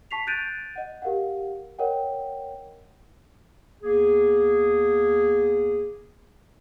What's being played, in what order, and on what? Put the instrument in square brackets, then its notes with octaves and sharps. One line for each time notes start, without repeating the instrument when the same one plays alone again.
[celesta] A5 C#6 B6 C7 F7
F#6 G6 A6 D7 D#7 F7
D#5 F#5
G4 A#4 F5 F#5
A#4 C#5 D#5 F#5 G5
[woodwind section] E2 A#3 G#4